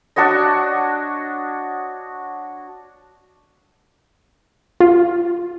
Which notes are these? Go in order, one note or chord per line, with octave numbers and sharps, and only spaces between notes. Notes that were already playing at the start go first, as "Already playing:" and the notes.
D4 F#4 C#5 D#5
F4